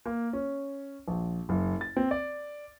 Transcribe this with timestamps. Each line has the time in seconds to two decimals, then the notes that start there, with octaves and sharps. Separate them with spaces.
0.06 A#3
0.33 C#4
1.08 A#1
1.49 F#1
1.81 A6
1.97 C4
2.11 D5